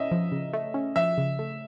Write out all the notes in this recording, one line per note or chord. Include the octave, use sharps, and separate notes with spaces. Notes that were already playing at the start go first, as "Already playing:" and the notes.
Already playing: C#4 D#5 E5
F3
C#3
A3
C#4
F3 E5
C#3
A3